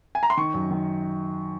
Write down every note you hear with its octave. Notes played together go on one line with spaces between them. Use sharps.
G#5
A#5
C6
D#3 C#6
F#2
D#3